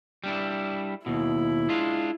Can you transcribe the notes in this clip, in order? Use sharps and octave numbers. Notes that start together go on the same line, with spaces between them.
G3 D4 E4
D#2 B2 E4
G#3 D4 F4